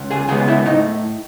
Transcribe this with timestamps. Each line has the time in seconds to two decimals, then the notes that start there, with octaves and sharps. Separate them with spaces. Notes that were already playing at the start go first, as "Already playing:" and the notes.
Already playing: C#2
0.11 G#4 G#5
0.29 C#3 G#3 B3 G#4 G#5
0.48 E4 E5
0.65 A2 D#4 D#5